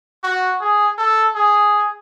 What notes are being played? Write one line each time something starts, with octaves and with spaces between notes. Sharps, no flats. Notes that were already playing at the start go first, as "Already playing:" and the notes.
F#4
G#4
A4
G#4